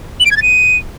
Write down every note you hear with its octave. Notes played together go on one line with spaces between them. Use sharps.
F#7
D7
G#6
A6
D#7